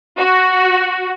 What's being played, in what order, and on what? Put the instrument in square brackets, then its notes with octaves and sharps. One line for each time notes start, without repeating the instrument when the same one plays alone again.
[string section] F#4